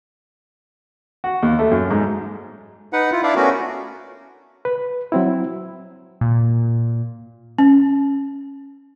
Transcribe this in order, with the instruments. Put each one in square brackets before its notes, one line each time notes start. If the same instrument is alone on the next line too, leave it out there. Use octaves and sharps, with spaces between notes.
[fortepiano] F#4
D#2
A3
F#2
G#2
[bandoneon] D#4 B4 F#5
E4 F4
D4 E4 D5 E5 F5
A3 B3 C#4 F#4 A#4
[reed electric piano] B4
F#3 C4 E4
[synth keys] A#2
[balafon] C#4